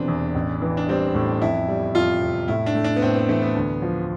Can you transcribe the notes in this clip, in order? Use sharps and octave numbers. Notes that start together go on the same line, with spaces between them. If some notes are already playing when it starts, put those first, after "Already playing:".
Already playing: E1 C3 E3 B3 C4 D4
E2
A1
E3
D4
G3 C4
A2
F2 E4
G3
F2 F4
C3
A2 E4
D4
A3
D4
B3
A2 C4
B3
E3 A3
B3
D2
F3